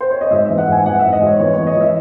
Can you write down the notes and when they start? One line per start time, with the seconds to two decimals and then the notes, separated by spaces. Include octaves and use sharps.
0.01 C5
0.11 C#5
0.21 D#5
0.31 G#2 E5
0.45 E5
0.50 E3
0.58 F#5
0.67 G#2 G#5
0.86 E3 F#5
0.99 G#2 E5
1.12 D#5
1.22 G#2 C#5
1.40 E3 C#5
1.53 E3 C#5
1.67 D#5
1.76 E3 E5